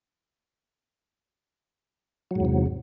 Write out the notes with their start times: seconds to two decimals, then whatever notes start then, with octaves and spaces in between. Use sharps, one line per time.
2.31 F#3
2.35 G#2
2.40 E2
2.45 C3